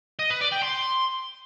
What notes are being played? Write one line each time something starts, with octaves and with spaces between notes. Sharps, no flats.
D#5
B4
D5
G5
C6